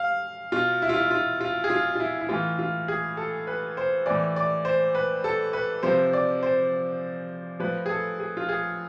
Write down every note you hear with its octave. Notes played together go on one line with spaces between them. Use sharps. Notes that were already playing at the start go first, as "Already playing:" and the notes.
Already playing: F5
B2 F4
E4
F4
E4
F4
F4
G#4
F4
F4
E4
E4
A2 E3 F4
F4
G#4
A4
B4
C5
A2 E3 D5
D5
C5
B4
A4
B4
C3 F3 C5
D5
C5
A2 F3 B4
G#4
A4
G#4
F4
G#4